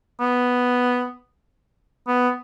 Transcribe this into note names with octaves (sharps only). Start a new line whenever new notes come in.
B3
B3